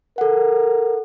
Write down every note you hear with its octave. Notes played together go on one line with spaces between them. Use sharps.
A4 A#4 F#5